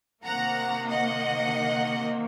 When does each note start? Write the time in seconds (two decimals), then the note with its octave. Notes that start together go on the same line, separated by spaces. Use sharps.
0.25 C3 D#3 A#3 F#5 A#5
0.89 D#5 F#5